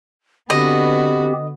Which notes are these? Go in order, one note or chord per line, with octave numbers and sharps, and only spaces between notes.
D3 B3 C4 F#4 G4 B4 D#5